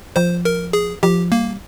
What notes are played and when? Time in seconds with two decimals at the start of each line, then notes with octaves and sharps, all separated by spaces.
0.16 F3 C5
0.45 A#4
0.73 G#4
1.03 F3 G4
1.32 G3 A#3